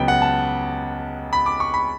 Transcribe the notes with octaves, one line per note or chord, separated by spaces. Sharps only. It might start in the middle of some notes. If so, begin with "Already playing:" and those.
Already playing: C#2 C#3 F#3 B3 G5
F#5
A5
B5
D6
C#6
B5